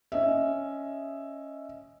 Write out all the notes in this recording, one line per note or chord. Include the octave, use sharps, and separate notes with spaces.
C#4 D#5 E5